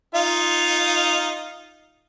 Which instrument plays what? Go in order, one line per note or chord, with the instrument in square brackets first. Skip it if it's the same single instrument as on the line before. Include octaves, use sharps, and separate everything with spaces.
[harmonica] D#4 F4 F5